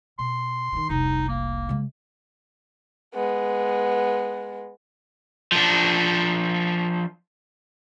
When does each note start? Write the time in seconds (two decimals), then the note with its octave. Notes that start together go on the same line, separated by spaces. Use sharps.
0.19 B2 C6
0.73 D#3 E3
0.89 F1 C2 D#4
1.28 A#3
1.69 C#3 G#3
3.15 G#3 B3
5.52 F3 D4